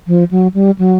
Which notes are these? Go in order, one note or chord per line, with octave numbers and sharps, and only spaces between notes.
F3
F#3
G3
F#3